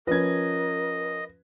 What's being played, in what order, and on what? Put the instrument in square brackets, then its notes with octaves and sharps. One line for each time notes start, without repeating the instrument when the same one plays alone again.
[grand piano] F3 C#4 [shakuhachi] A#4 [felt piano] B4 G#6 [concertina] D#5